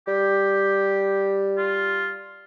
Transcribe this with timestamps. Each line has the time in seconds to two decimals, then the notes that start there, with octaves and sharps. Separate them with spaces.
0.08 G3 G4
1.57 F4